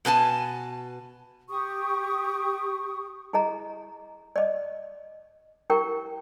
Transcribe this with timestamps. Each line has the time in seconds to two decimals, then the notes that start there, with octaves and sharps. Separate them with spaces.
0.05 B2 B4 G#5 A5
1.49 G4 C#6 D#6
3.33 E4 G#4 D#5 A#5
4.36 D5 D#5
5.70 E4 G4 A#4 G5 C#6